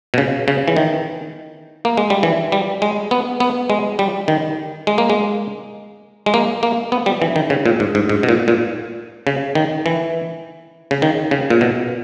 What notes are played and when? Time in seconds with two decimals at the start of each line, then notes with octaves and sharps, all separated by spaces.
0.14 B2
0.18 C#3
0.48 C#3
0.68 E3
0.76 D#3
1.85 A#3
1.97 G#3
2.10 G3
2.23 E3
2.52 G3
2.82 G#3
3.11 B3
3.40 B3
3.70 G#3
3.99 G3
4.28 D#3
4.87 G#3
4.98 A#3
5.10 G#3
6.26 G#3
6.34 A#3
6.63 A#3
6.92 B3
7.06 G3
7.22 E3
7.36 D#3
7.50 C#3
7.66 A#2
7.80 G#2
7.95 G#2
8.09 G#2
8.23 B2
8.29 A#2
8.48 A#2
9.27 C#3
9.55 D#3
9.86 E3
10.91 C#3
11.02 D#3
11.31 C#3
11.50 A#2
11.61 B2